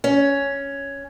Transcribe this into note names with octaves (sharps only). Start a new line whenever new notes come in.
C#4